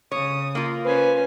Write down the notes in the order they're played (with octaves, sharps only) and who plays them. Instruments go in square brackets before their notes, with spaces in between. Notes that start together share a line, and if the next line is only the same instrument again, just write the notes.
[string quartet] C#3 D#6 [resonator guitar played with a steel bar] C#5
[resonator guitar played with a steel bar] A#3 F4
[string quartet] C#4 C5 G#5 [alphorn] B4